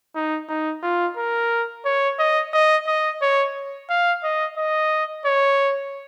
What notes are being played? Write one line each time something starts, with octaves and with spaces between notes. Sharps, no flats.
D#4
D#4
F4
A#4
C#5
D#5
D#5
D#5
C#5
F5
D#5
D#5
C#5